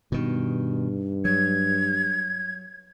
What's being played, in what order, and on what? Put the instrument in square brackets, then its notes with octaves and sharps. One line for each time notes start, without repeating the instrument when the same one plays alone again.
[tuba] G2 [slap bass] B2 D#3
[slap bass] F#3 [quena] G#6